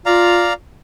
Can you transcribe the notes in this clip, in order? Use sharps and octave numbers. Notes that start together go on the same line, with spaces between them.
F4 D5 F5 A#5